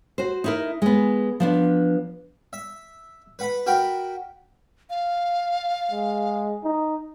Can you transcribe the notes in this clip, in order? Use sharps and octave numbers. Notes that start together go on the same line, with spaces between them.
F#4 C5
D#4 E4 A#4
G#3 B3
F3 B3 D4
E5
B4 F#5 B5
F#4 A#4 G5 B5
F5
G#3
D#4